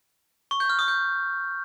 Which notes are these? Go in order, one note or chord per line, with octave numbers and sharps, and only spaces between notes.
C#6
G6
F6
D#6
G6